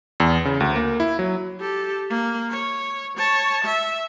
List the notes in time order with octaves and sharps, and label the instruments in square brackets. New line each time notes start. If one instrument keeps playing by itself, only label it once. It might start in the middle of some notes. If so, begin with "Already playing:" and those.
[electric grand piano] E2
C#3
D2
A#3
E4
F#3
[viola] G4 A4
A#3
C#5
C#5 A5
E5